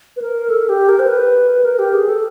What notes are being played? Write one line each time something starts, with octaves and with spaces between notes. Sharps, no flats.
B4
A#4
A4
G4
A#4
C5
B4
A#4
G4
G#4
A4